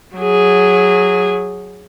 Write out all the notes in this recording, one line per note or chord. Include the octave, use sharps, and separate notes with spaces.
F#3 G#4